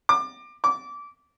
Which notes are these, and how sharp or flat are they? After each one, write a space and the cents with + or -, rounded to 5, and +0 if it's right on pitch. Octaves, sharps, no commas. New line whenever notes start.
D6 +25
D6 -20